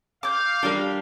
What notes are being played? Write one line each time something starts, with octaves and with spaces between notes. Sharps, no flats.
F5 D6 G6
G3 D4 A#4 G5